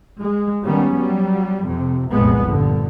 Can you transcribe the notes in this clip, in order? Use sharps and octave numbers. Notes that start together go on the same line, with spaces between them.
G#3
D#3 G3 B3 C#4
F#3 G3
F2 C3
F1 C2 F2 A#2 G#3 B3
G2 A#2 D3